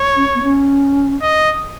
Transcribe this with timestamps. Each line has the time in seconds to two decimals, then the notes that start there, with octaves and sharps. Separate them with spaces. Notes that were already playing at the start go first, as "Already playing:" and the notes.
Already playing: C#5
0.16 C#4
0.35 B3
0.43 C#4
1.22 D#5